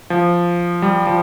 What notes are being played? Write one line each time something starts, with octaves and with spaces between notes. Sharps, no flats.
F3
G3
F3